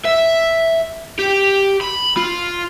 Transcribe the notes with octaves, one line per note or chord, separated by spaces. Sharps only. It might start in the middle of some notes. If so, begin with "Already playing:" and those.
E5
G4
B5
F4